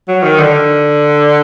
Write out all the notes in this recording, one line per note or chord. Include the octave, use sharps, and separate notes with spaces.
F#3
D#3
D3